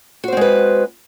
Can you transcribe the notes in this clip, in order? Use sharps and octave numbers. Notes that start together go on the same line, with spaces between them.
G#3 C4 F#4 B4 C5